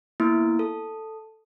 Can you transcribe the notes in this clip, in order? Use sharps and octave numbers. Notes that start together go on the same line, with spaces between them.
A#3 B3 E4
A4